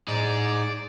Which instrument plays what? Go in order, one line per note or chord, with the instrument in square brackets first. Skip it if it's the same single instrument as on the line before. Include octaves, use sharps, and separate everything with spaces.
[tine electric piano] A2 [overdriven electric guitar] G#3 D#4 [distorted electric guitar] D5